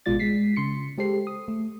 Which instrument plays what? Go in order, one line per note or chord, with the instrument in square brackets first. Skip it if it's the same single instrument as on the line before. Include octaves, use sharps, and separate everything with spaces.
[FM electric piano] A1 B2 G#3 F4 D5 A6
G#3 B6 C7
C#3 C6 C#7
G#3 G4 A4 C5 C7
D#6
A3